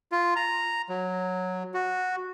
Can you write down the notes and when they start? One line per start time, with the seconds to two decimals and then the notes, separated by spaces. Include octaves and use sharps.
0.12 F4
0.36 A#5
0.89 F#3
1.74 F#4